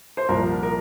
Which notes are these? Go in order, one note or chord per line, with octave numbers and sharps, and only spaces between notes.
C5
C2 A#2 F3 A#4
A#4